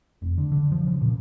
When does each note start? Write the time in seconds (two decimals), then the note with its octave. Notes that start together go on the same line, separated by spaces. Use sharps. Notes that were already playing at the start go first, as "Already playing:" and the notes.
0.22 F1
0.38 D3
0.52 D3
0.72 F3
0.87 C#3
1.02 A#2